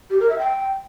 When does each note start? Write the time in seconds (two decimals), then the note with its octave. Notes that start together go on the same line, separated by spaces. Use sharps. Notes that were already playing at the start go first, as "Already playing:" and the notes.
0.10 G4
0.20 A#4
0.29 E5
0.39 G5